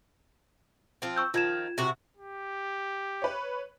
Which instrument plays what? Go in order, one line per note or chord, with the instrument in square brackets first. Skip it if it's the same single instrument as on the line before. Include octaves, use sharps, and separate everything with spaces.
[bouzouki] F3 C4
[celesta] C#6 E6 G6
[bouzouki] D#3 F3 [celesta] F4 G#6 E7
[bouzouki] C3 F#4
[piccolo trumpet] G4
[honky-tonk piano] B4 C#5